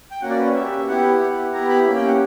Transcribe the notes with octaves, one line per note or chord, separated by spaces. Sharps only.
G5
A#3 C#4 F#4 F#5
D5
B4
C#5
C#4 G4 E5
B3 E4 G4 F#5
B3 E4 G4
B3 E4 G4 A#5
B5
A#3 C#4 G4
G5
F#5